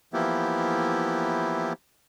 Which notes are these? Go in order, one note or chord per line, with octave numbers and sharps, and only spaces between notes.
E3 F3 A#3 B3 E4 G4